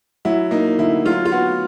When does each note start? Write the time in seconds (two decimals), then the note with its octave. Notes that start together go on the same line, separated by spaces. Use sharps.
0.25 F#3 E4
0.51 A#3 D#4
0.78 D3 E4
1.05 F#3 F4
1.25 F4
1.31 B3 F#4